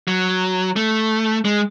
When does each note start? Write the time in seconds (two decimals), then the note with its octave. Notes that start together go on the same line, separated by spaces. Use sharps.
0.08 F#3
0.76 A3
1.45 G#3